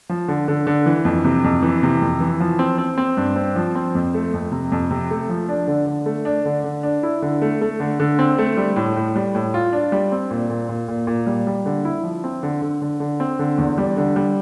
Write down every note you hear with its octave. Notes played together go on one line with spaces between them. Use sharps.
F3
D3
D3
D3
E3
F2
C3
F2
E3
C3
F2
E3
F3
C4
C4
C4
G2
C4
F3
C4
F2
A3
F2
C3
F2
C3
A3
F3
D4
D3
D3
A3
D4
D3
D3
D4
E4
D3
A3
A3
D3
D3
C4
A3
G3
A2
A2
G3
A2
F4
D4
G3
C4
A#2
A#2
A#2
A#2
A#2
G3
G3
D3
E4
F3
C4
D3
D3
D3
D3
C4
D3
E2
G3
D3
G3